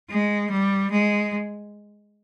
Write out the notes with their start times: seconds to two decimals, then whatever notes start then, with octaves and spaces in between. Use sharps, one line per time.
0.10 G#3
0.51 G3
0.91 G#3